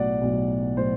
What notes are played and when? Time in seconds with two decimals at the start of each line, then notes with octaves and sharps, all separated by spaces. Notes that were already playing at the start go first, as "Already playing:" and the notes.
Already playing: B1 A2 F#3 D5 F#5
0.21 B1 A2 F#3
0.77 A2 F#3 C5